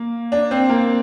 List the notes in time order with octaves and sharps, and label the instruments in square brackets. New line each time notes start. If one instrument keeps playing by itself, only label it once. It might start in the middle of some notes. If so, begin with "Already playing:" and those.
Already playing: [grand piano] A#3
D4
C4
A#3